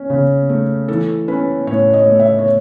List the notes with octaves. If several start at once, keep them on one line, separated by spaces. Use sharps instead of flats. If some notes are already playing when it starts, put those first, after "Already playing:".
Already playing: C#4
C#3
A3
E3 A4
C#4 B4
A2 C#5
D#5
A3
E5
C#5